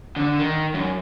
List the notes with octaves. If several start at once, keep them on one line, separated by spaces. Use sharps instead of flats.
D3
D#3
F#2